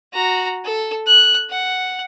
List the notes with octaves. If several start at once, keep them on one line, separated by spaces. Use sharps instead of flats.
F#4 A#5
A4
F#6
F#5